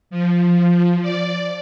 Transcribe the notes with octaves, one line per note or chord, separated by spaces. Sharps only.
F3
D5